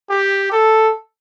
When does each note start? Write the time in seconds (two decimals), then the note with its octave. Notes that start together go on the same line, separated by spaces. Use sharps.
0.10 G4
0.52 A4